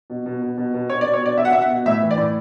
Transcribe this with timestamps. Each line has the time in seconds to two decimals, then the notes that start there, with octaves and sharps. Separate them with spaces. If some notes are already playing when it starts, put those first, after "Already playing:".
0.10 B2
0.26 B2
0.42 B2
0.58 B2
0.74 B2
0.90 B2 C#5
1.01 D5
1.05 B2
1.13 C#5
1.22 B2 D5
1.38 B2 E5
1.45 F#5
1.53 B2 E5
1.62 F#5
1.70 B2
1.86 A2 E5
2.02 E3
2.11 D5
2.17 A2